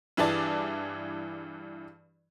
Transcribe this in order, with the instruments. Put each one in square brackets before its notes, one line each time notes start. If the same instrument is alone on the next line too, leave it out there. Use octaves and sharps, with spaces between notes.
[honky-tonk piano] G2 E3 E4 G#4 D5 A5